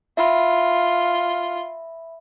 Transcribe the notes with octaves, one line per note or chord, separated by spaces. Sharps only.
F4 E5 B5